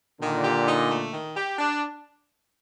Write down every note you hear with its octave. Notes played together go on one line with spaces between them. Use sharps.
A#2 D3 D#3
G4
D#4
A3
D#3
G4
D4